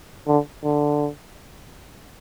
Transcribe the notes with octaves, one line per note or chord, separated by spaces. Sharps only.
D3
D3